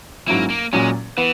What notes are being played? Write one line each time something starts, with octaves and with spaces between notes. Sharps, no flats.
G#2 F#3 A#3 C#4 E4
A#3
A#2 F#3 G#3 C#4
E3 B3